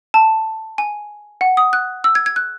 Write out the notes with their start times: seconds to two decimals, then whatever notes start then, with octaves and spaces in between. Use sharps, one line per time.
0.14 A5
0.78 G#5
1.41 F#5
1.57 D#6
1.73 F#6
2.04 E6
2.15 G#6
2.26 G#6
2.36 F#6